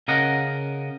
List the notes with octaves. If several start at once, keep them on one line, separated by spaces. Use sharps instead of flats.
C#3 A#4 D#5 F#5